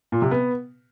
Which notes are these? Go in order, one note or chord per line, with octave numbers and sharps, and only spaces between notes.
A#2
C3
B3